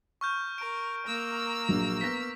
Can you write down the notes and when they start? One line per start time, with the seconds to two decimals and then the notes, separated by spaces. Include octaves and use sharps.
0.21 C#6 F6 G6
0.58 A#4 D7
1.06 A#3 A#5 E6
1.69 A#1 F#3
2.01 B3 A#6 B6